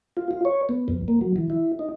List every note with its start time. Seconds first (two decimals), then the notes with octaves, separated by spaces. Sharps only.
0.17 F4
0.31 F4
0.45 C#5
0.69 B3
0.88 F2
1.08 A#3
1.21 F#3
1.36 E3
1.50 E4
1.79 D#4